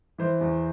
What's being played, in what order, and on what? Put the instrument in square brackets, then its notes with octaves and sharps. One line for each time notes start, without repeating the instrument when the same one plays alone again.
[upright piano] E3 C5
E2